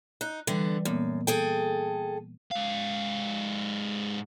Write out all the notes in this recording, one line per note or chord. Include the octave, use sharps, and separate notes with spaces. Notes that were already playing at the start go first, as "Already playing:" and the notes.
D#4 F#6
D3 E3 G3 B3
F#2 A#2 A#3 B3
G#4 A4 G5
G#2 F5